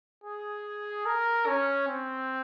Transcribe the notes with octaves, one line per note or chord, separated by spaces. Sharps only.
G#4
A#4
C#4
C4